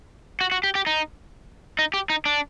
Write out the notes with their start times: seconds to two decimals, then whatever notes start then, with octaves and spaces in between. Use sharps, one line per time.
0.41 F#4
0.52 F#4
0.64 G4
0.75 G4
0.86 D#4
1.79 D#4
1.94 G4
2.10 D#4
2.26 D4